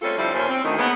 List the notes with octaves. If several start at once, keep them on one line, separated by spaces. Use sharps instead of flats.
G3 A3 C4 C#4 F4 A4
D3 F3 G3 C4 E4
D#2 A#2 F3 C#4 C5
C4
D2 D#3
C#3 G#3 A#3 B3